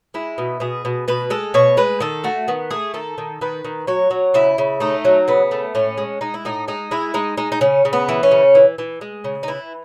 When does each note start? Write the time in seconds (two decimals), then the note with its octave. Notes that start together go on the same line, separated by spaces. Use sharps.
0.14 G#3 E4
0.38 B2
0.60 B2 G#4
0.85 B2
1.08 B2 B4
1.30 G#3 A4
1.54 B2 C#5
1.77 G#3 B4
2.00 D#3 A4
2.24 A3 F#4
2.48 D#3 B3
2.71 A3 G#4
2.94 D#3 A4
3.18 D#3
3.41 D#3 B4
3.64 D#3
3.87 F#3 C#5
4.11 F#3
4.34 C#3 E4
4.58 C#3
4.80 A3 D#4
5.05 F#3
5.28 C#3 B3
5.51 A3
5.75 A2 C#4
5.98 G#3
6.21 G#3 D#4
6.34 E4
6.45 A2 D#4
6.68 G#3 D#4
6.91 G#3 E4
7.14 G#3 D#4
7.37 G#3 D#4
7.52 D#4
7.61 C#3 C#4
7.85 C#3
7.93 B3
8.09 E3
8.23 C#4
8.31 C#3
8.55 E3
8.78 E3
9.01 G#3
9.24 C#3
9.43 D#4
9.48 E3 E4